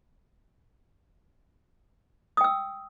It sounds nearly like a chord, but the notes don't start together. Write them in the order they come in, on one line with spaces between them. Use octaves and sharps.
D#6 G5 E6